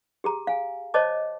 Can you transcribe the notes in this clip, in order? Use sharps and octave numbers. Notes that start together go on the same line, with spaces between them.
G4 G#4 A#5
F5 G#5
C5 C#5 D#5 A5 D6